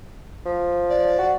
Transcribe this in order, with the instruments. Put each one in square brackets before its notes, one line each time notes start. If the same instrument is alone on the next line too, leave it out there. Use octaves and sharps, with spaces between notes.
[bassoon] F3
[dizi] D5
[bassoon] F#4